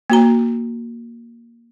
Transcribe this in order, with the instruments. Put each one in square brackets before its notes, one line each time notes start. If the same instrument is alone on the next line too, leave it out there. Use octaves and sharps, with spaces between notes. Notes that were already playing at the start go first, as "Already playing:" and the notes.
[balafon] A#3 F#4 A#5